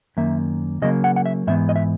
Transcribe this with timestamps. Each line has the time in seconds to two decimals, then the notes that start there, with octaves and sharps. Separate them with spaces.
0.17 F#2 D#3 A#3 E5
0.82 C#3 F#3 A#3 D#5
1.04 F#5
1.16 F#5
1.26 E5
1.47 G#2 E3 B3 E5
1.69 D#5
1.76 E5